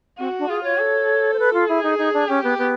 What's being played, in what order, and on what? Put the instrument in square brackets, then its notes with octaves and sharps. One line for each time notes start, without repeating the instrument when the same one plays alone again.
[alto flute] C4 [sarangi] F#4
[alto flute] D4
[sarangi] F4 [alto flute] G#4
[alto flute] C#5
[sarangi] A4
[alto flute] C5
B4
F4
[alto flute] E4 [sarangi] G#4
[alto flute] D#4
D#4
D4
[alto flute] C#4 [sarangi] G4
[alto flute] B3
B3